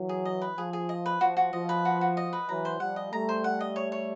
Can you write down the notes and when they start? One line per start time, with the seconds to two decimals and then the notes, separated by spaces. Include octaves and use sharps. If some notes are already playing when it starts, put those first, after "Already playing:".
Already playing: E3 F#3
0.09 G#4
0.25 D#5
0.42 B4
0.58 F3 G#4
0.73 G#4
0.89 D#5
1.06 B4
1.21 F3 F#4
1.37 F#4
1.53 F3 D#5
1.69 B4
1.85 F#4
2.01 F#4
2.17 D#5
2.33 B4
2.49 E3 F#3 A#5
2.65 C5
2.80 F3 G3 F#5
2.96 D#5
3.12 G3 A3 A#5
3.29 C5
3.44 F#5
3.61 D#5
3.76 C#5
3.92 C#5